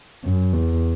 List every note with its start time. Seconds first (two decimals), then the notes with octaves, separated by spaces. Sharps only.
0.24 F#2
0.53 E2